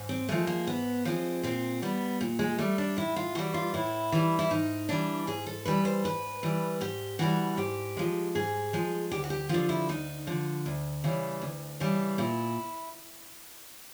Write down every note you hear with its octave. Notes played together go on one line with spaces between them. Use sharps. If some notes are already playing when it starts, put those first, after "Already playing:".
Already playing: G#2
C4
F3 G#3 A3
A#3
G#2 B3
F3 G#3 C4
A#2 C4
G3 B3
A#2
G#3
G3 A3
D4
A2 E4
F4
E3 G3 F#4
F4
A2 E4
E3 G3
E4
G#2 D#4
E3 G3 D4
G#2 G#4
A4
E3 G3 B4
C5
G#2 B4
E3 G3
G#2 G4
E3 G3 F#4
G#2 G4
F3 G#3
G#2 G#4
F3 G#3
D2 G4
F#4
G4
D3 F3 F4
E4
D2 D#4
D3 F3
D2
C#3 E3 G3
D2
C#3 E3 G3
A#2 E4